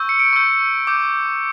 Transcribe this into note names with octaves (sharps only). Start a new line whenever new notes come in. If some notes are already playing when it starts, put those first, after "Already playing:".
Already playing: C#6 E6 G6
C#7
D7
C#6 E6 G6
D6 G6